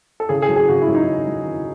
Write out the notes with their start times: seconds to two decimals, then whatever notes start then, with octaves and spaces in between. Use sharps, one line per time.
0.20 A4
0.29 C#3 G#4
0.42 G#4
0.49 F#3
0.56 G#4
0.69 C#3 F#4
0.82 E4
0.88 F#3
0.95 D#4
1.08 C#3
1.28 F#3
1.47 C#3